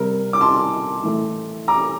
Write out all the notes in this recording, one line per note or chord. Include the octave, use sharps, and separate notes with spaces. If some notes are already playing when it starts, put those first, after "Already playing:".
Already playing: C3 G3 A#4
D6
A5 C6
A2 E3 A3
A#5 D6